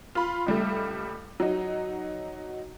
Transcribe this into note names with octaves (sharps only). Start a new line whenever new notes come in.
F4 B5
C#2 G3 A3
F#3 D#4